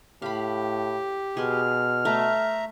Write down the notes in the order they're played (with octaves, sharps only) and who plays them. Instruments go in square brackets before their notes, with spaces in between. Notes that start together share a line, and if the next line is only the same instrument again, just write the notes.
[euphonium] A2 [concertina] G4 [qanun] F5 B5
[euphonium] B2 [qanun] G#4 C6 [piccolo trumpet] F6
[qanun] A3 [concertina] E5 A#5